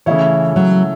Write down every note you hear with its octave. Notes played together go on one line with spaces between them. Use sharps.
C#3 E3 A3 E4 C#5
F#3